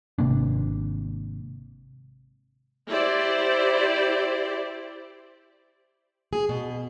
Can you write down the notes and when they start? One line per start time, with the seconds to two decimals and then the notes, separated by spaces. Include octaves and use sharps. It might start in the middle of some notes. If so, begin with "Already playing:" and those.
0.19 G#1 C3 A#3 D4
2.90 E4 G4 C5 D5
6.33 G#4
6.49 B2